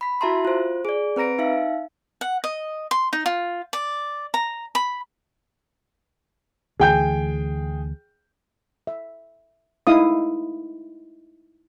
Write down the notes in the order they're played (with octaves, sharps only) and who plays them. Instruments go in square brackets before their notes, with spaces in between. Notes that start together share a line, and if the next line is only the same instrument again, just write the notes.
[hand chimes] B5 B6
E4 F#4 E5 A5 A#5 C6
F4 C5
G#4 D5
C4 B4 A#5 A#6 D7
D#4 E5 F5
[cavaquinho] F#5
D#5
C6
D#4
F4
D5
A#5
B5
[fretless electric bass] D2 E3 [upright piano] G#4 G5 G6
[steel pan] E5
D#4 E4 F5 D#6